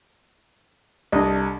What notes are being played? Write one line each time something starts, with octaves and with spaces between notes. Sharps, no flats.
C2 D4 D#5